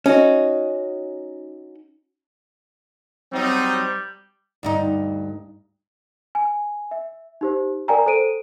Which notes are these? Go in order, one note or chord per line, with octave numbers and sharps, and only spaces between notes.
C#4 D#4 F#4
F#3 G3 C4 D#4
D2 G2 D#4
G#5
E5
D#4 G4 C5
A#4 D5 G5 G#5 A#5
A4 C5 D7 D#7